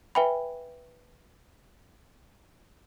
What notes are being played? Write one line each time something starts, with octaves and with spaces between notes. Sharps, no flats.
B4 E5 G5 G#5 B5